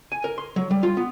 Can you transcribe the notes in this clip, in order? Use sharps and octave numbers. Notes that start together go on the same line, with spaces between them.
G#5
A#4
C6
F#3
G3
F4
B3